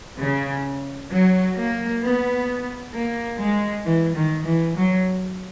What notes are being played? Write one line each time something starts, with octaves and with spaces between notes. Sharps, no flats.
C#3
F#3
A#3
B3
A#3
G#3
E3
D#3
E3
F#3